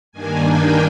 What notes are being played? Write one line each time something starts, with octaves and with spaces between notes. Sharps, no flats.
G2 D#3 A#3 D4 G#5
G5